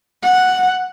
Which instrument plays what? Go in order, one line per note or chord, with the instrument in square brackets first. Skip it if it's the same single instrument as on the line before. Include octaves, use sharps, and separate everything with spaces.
[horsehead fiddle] F#5